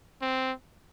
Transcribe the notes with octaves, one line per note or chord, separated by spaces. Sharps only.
C4